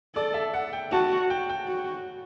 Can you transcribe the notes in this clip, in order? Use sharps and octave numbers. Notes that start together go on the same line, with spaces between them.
A4 D5
E5
F#5
G5
F#4 A5
G5
G5
F#4